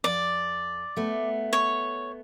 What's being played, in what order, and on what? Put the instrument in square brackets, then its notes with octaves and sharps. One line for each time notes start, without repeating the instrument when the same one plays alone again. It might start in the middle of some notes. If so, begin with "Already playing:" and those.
[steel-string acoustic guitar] F2 [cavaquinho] D5
[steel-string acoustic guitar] A3 B3
[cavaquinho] C#5